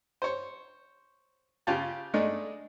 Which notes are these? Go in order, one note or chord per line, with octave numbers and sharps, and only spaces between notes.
C5 C#5
C#3 F4 G4 A5
G#3 A3 D4 D#4